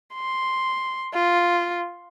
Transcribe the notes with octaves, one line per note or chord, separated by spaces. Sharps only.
C6
F4